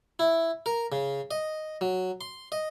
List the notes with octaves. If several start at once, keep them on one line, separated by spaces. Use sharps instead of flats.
E4
A#4
C#3
D#5
F#3
C6
D#5